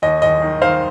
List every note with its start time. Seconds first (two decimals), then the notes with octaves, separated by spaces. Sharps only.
0.02 D#2 D#5
0.22 D#2 D#5
0.42 D#3
0.62 D#3 C5 F5